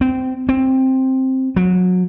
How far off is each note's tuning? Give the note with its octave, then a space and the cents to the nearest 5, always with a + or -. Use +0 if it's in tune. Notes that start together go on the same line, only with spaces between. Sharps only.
C4 -20
C4 +5
F#3 -25